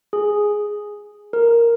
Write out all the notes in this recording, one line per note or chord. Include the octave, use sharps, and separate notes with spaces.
G#4
A#4